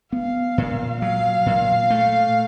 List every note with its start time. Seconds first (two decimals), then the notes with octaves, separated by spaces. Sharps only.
0.12 B3 F5
0.58 A#2
1.01 F#3 F5
1.46 A#2
1.90 A3